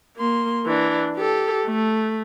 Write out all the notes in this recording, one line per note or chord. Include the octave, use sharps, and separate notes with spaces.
A#3 C6
E3 D4
G4 A4
A3